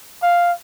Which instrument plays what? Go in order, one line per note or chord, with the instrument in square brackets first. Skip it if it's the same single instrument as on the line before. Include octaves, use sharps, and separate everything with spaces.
[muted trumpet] F5